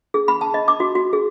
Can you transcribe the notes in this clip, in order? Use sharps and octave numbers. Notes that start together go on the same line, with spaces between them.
G#4
B5
A5
D#5
D6
F#4
F#4
G#4